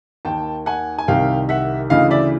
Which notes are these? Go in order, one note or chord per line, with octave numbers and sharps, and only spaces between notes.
D#2 D#3 G5 A5
F#5 G#5
G#5
C2 C3 D#3 F5 G5
E5 F#5
D2 C#3 E3 D#5 F5
D5 E5